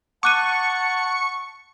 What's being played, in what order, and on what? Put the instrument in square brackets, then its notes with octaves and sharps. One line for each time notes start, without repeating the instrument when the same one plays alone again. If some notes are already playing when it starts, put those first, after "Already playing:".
[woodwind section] F#5 A5 [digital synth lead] C#6 [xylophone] D6 F#6 D#7